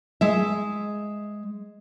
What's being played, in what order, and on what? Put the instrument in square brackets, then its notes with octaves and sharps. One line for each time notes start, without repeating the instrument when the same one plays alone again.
[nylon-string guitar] G#3 E5